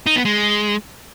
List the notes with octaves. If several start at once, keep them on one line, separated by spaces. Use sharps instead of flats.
D#4
B3
G#3